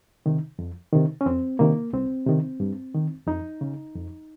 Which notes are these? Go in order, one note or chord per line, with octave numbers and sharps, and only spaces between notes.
C3 D#3
F2
C3 D#3
C#4
F2 C4
C3 D#3 A#3
C2 C4
C3 D#3
G2
D#3
F2 D#4
C#3
F2